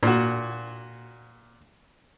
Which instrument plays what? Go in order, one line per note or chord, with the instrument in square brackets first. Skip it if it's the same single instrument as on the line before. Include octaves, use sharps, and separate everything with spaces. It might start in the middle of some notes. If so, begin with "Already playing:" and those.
[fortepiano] A#2 F#4